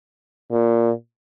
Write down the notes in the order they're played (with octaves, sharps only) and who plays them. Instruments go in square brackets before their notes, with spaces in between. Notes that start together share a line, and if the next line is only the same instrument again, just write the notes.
[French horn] A#2